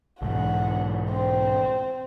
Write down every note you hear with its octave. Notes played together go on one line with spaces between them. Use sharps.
B1 G#2 E3 F#5
C4